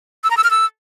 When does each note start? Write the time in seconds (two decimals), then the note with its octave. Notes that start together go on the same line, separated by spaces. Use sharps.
0.24 E6
0.30 A#5
0.37 E6
0.44 F6
0.51 E6